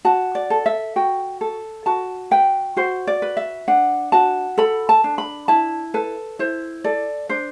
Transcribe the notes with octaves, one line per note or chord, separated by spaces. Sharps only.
F#4 A5
D5
A4
E5
F#4 G5
A4
F#4 A5
B4 G5
F#4 C5
D5
B4
E5
D4 F#5
F#4 A5
A4 B5
A5
D4
B5
E4 A5
A4 B4
E4 C5
A4 D5
D4 C5